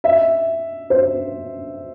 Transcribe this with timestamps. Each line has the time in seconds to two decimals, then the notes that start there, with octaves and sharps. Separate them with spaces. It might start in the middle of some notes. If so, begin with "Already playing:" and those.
0.04 E5
0.90 C5